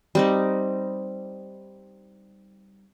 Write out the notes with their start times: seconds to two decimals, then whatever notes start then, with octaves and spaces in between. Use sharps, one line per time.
0.15 G3 C4 D#4